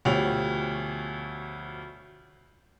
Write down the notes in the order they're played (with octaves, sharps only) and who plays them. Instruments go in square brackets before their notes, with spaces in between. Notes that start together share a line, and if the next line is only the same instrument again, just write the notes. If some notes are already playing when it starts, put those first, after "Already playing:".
[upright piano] D2 B2 F3 G4 C#5 F7